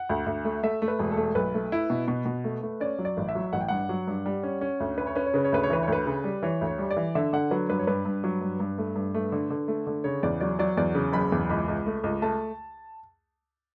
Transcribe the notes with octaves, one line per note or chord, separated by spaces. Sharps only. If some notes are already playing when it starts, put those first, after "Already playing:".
Already playing: F#5
D2
D2
A3
A3 E5
A3
B4
E1
A4
A3
B1 B4
A3
E4
B2
B2
B2
A3
A3
C#4 D5
F#3
D5
A1
E5
F#3
A1 F#5
G5
G2 F#5
F#3
G2
G3
C#4
C#4
D2
C#4 B4
C#5
C#4 B4
C#5
C#3 B4
C#5
D2 B4
C#5
E3 B4
C#5
D2 B4
C#3
G3
E3 C#5
D2
C#5
G3
D5
E3
D3 E5
D3 F#5
F#3 B4
G2 B4
C#5
G2 B4
G2
F#3
G2
G2
A3
G2
A3
D3
D3
A3
D3
C#3 C#5
E2 D5
F#3 D5
F#3 D5
E2 D5
C#3
F#1 B5
E2
C#2 B5
C#2
A3
C#2
A3 A5